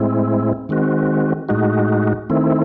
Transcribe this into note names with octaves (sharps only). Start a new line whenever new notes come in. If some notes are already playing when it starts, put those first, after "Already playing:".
Already playing: A2 G#3 C4 E4
D#3 G#3 C4 F#4
A2 G#3 D#4 F#4
D#3 A3 C4 E4